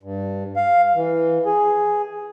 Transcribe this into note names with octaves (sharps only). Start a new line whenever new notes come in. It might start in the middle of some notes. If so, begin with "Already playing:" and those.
G2
F5
E3
G#4